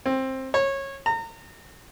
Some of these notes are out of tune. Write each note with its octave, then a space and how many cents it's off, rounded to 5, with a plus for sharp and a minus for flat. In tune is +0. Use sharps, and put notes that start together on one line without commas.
C4 +15
C#5 -20
A#5 -35